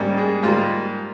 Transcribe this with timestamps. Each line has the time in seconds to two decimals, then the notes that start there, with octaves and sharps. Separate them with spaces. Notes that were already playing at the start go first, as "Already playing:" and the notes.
Already playing: G#2 G3 A#3 C#4
0.17 G#3 G#4
0.43 G#2 G3 A#3 F4